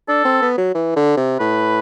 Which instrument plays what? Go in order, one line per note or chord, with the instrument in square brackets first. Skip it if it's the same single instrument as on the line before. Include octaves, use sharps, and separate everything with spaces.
[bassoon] D4 [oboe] A4
[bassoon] C4
B3
F#3
E3
D3
C3
[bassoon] A2 [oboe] B4